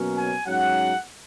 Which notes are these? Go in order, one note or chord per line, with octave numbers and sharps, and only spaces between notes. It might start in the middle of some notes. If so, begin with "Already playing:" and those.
Already playing: B2 F#3 A#3 C#4
G#5
G#2 F#3 C#4 F#5